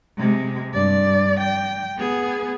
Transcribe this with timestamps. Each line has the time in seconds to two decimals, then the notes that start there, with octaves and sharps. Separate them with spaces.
0.17 C3 G#3
0.72 G2 D5
1.40 G5
1.97 B3 G#4